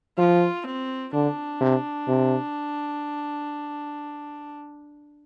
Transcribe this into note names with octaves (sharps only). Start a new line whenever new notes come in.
F3 F4
C4
D3 D4
C3
C3